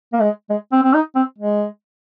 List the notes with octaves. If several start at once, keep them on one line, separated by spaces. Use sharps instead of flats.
A#3
G#3
G#3
C4
C4
D#4
C4
G#3